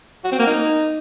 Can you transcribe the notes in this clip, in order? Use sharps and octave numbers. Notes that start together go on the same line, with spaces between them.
F#4
C4
A#3
D#4